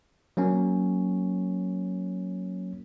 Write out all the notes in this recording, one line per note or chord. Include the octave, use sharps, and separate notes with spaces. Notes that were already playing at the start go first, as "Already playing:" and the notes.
F#3 A#3 C#4